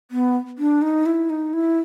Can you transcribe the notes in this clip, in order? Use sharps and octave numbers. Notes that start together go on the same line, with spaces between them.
B3
D4
D#4
E4
D#4
E4